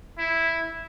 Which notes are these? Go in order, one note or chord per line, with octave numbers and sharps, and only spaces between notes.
E4